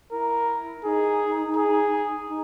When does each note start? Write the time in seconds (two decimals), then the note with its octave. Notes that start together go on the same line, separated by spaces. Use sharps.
0.12 E4 A#4
0.84 D#4 G#4
1.56 G#4
2.28 D#4